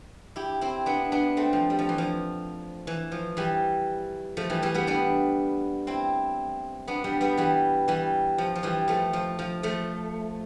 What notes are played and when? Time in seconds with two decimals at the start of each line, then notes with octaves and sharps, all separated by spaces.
0.36 E4 G4
0.61 C4 E4
0.86 B3 D4
1.12 B3 D4
1.37 A3 C4
1.53 F3
1.70 G3
1.79 F3
1.89 E3
1.98 F3
2.87 E3
3.12 F3
3.37 E3 G3
4.37 F3 A3
4.50 E3 G3
4.62 E3 G3
4.74 G3 B3
4.87 B3 D4
5.87 C4 E4
6.88 B3 D4
7.04 G3 B3
7.21 G3 B3
7.37 E3 G3
7.88 E3 G3
8.38 F3
8.55 F3
8.63 E3 G3
8.88 F3 A3
9.13 F3
9.39 F3
9.63 F3 A3